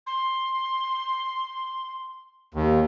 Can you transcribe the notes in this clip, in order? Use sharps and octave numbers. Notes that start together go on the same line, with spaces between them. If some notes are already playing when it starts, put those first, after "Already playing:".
C6
D#2